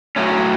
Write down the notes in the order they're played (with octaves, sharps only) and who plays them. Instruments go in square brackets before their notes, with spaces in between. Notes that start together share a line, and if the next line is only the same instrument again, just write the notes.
[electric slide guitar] A2 F#3 A3 C#4